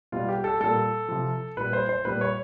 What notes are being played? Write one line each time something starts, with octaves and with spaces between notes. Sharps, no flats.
B2 G3 F4
G4
A4
A#2 G3 A4
C3 F3
A#2 G3 B4
C5
C5
A#2 G3 B4
C#5